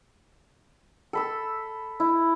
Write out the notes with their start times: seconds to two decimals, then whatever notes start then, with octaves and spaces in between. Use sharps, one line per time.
1.13 A4 B5 E6
2.00 E4